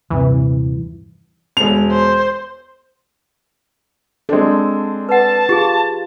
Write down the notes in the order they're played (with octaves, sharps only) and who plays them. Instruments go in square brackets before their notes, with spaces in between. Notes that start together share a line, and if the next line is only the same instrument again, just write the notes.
[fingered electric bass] D#1 G2 C3 [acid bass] E3
[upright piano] E1 F7
[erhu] C5
[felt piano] G#3 C4 D4 [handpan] A4
[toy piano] B4 F#5 [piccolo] A5
[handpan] F4 [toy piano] G4 G#4